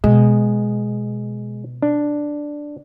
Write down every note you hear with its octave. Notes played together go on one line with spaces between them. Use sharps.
B2 G#3
D4